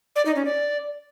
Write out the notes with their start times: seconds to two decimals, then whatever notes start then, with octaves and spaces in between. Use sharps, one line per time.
0.16 D5
0.26 D#4
0.35 C#4
0.45 D5